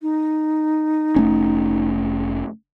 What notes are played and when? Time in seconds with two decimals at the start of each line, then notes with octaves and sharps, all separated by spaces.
0.01 D#4
1.16 F1 A3 C#4